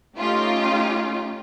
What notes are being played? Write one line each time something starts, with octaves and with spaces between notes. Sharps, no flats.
A3 C#4 D#4 F4 G4